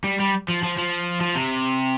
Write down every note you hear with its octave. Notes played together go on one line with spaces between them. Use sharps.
G3
G3
F3
F3
F3
F3
C3